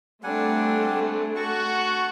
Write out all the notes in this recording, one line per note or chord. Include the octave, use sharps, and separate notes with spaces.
G3 A3 C4 D4 F#5 G#5
F#4 F#5 A5 C#6